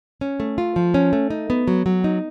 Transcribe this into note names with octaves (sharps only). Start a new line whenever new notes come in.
C#4
A3
F4
F3
C#4
A3
D#4
B3
F#3
F#3
D#4